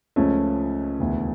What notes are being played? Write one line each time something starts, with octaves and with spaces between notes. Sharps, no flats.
C#2 C#3 F3 A3 C#4
E1 D2 C#3 E3